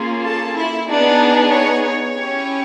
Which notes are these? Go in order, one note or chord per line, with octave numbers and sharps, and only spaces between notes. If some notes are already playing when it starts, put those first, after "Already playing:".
Already playing: A#3 C#4 F4 G#4
A4 A5
E4 E5
B3 D4 D#4 G#4 D5
C#5
C#5
C#4 E4 G4